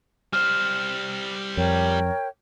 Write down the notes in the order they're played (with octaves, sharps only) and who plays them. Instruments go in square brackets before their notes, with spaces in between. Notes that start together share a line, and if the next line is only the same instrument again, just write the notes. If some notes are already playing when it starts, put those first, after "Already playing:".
[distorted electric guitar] G3 C5 [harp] F6
[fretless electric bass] F2 [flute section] A#4 C#5 G5